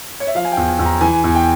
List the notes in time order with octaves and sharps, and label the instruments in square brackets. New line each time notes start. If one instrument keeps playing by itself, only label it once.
[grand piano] C#5
E5
F3 F5
G#5
G5
E2
G#5
E2
A#5
E3 G#5
E2
G5